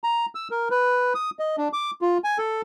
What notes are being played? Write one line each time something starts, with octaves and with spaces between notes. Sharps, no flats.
A#5
E6
A#4
B4
D#6
D#5
D4
D6
F4
G#5
A4